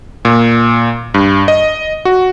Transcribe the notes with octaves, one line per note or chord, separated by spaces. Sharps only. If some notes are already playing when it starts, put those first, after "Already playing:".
A#2
G2
D#5
F#4